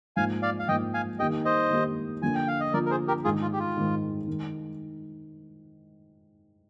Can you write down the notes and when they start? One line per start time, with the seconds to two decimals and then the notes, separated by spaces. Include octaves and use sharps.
0.17 G#2 F3 A#3 F5 G#5
0.42 D5 F5
0.60 F5
0.68 G#2 F3 A#3 D#5 G5
0.94 F5 G#5
1.19 D#3 A#3 D#4 G4 D#5 G5
1.45 C5 D#5
1.70 D#3 A#3 D#4 G4
2.22 D3 F3 A#3 F4 G#5
2.35 G5
2.48 F5
2.61 D#5
2.73 D3 F3 A#3 F4 A#4 D5
2.86 A#4
2.91 G#4 C5
3.08 G4 A#4
3.24 G#2 D#3 G#3 F4 G#4
3.42 F4
3.53 G4
3.59 F4
3.77 G#2 D#3 G#3
4.28 D#3 G#3